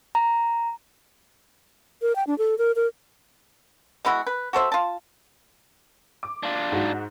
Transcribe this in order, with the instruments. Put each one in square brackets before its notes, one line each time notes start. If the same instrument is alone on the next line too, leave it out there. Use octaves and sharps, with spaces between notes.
[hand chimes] A#5
[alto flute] A#4
G5
D4
A4
A#4
A#4
[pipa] G#3 B3 E4 F#4
B4
F#4 A4 C5 E5
F4 A5
[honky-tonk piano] D6
[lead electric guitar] D4 F4
[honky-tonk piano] G#2 F#4